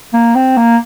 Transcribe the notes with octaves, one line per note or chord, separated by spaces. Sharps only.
A#3
C4
A#3